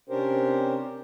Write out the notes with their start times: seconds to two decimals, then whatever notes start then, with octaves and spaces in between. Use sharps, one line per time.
0.09 C3 C#4 D4 G4 A#4 C5